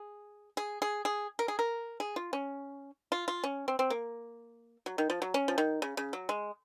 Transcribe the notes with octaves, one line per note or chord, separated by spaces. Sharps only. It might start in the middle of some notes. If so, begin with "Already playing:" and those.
Already playing: G#4
G#4
G#4
G#4
A#4
G#4
A#4
G#4
F4
C#4
F4
F4
C#4
C4
C4
A#3
F#3
D#3
F3
F#3
C#4
F3
D#3
C#3
C#3
F#3
G#3